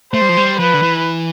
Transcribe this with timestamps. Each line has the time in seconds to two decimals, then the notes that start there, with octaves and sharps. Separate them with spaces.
0.13 A3 C5
0.22 G3
0.29 F3
0.37 G3
0.59 F3 B4
0.74 D3
0.82 E3